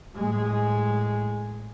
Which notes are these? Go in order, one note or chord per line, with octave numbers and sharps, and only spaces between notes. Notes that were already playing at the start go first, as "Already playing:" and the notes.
A2 G#3